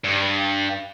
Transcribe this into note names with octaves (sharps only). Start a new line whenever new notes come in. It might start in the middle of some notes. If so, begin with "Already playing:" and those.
G2